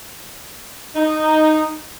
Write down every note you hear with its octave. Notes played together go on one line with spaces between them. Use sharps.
D#4